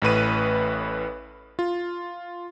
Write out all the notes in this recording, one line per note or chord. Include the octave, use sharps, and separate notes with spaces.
A1 A2 B4 D#7
F4